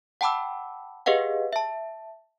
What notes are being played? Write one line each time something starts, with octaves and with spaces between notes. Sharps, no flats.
F#5 G5 A5 B5 D6 E6
G4 G#4 B4 D#5 F5 F#5
E5 A5